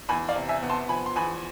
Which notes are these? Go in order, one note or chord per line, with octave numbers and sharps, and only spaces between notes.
E2 G#5 B5
D5 F5
C3
E5 G#5
B3
A5 C6
F3 G#5 B5
C6
E2 G#5 B5